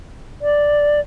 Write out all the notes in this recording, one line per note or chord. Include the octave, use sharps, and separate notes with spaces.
D5